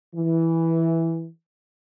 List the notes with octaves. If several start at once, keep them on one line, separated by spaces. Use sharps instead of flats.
E3